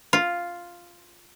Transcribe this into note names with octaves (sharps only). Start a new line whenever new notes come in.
F4